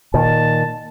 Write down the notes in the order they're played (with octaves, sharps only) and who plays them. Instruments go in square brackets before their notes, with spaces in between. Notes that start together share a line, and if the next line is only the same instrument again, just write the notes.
[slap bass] A#2 D#3 [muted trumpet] A5